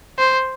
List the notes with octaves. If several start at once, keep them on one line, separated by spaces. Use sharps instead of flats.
C5